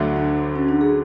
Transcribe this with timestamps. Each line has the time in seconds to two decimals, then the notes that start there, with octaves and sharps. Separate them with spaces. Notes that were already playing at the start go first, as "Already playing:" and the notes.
Already playing: D2 D3 F#3 A3
0.16 D4
0.55 C#4
0.68 D4
0.81 G#4